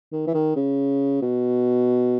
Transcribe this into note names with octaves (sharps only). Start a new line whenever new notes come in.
D#3
E3
D#3
C#3
B2